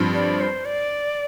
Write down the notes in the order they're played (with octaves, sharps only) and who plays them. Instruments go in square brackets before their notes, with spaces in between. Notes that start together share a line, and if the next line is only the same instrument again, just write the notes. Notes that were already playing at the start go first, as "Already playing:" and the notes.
Already playing: [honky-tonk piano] G2 F3 C4
[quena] D5
C5
D5